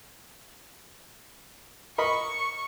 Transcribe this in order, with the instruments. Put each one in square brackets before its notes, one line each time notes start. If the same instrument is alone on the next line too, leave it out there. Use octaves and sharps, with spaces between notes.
[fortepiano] A#4 D#5 B5 [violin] C#6